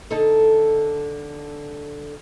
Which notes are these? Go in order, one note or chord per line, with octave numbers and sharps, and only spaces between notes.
D3 D#4 A4